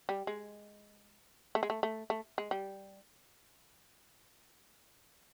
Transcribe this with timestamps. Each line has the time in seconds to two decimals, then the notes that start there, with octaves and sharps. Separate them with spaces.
0.09 G3
0.27 G#3
1.55 A3
1.63 G#3
1.70 A3
1.83 A3
2.10 A3
2.38 G#3
2.51 G3